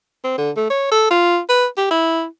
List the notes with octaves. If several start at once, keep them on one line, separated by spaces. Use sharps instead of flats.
C4
D3
A3
C#5
A4
F4
B4
G4
E4